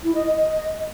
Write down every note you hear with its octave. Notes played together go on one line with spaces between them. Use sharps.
E4
D#5
D#5